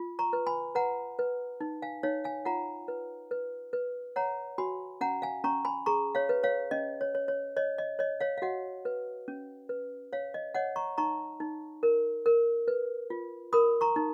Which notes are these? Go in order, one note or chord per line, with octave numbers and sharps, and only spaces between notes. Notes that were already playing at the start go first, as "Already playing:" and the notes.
Already playing: F4
A#5 C#6
B4
G#5 B5
B4 F#5 A#5
B4
D#4
F5 G#5
D#4 C#5 F5
F5 G#5
F4 F#5 A#5
B4
B4
B4
C#5 F#5 A#5
F#4 G#5 B5
C#4 F#5 A#5
F5 G#5
C#4 A#5 C#6
G#5 B5
G#4 A#5 C#6
C#5 F5
B4
C#5 F5
C#4 D#5
C#5
C#5
C#5
C#5 D#5
D#5
C#5 D#5
C#5 F5
F5
F#4 D#5 F#5
B4
C#4
B4
C#5 F5
D#5
C#5 D#5 F#5
A#5 C#6
D#4 A#5 C#6
D#4
A#4
A#4
B4
F4
A#4 B5 D#6
A#5 C#6
D#4